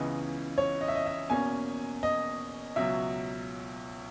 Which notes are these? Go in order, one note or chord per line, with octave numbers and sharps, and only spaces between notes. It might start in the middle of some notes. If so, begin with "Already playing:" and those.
Already playing: C#2 C#3 E3 B3 D#5
C#5
D#5
E5
D#5
E5
E2 B2 A#3 C#4 G#5
D#5
C#2 B2 F#3 E5